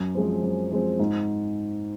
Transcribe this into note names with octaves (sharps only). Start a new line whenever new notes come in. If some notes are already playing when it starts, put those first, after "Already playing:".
Already playing: F#2
F3 G#3 C4
F#2
F3 G#3 C4
G#2